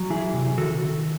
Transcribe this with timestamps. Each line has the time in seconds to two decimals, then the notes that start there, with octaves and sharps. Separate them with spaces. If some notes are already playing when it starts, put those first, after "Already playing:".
Already playing: F#3
0.10 E3 E4 G#4
0.34 C3
0.58 D#3 F#4 A4